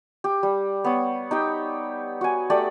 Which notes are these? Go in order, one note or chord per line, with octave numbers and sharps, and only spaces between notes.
G4
G3
B3 C#5
D#4 G4 G5
F#4 G#5
A3 G4 D5 G5